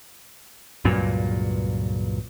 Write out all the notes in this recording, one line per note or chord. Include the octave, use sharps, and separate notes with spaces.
C#2 G2 A#2 F#3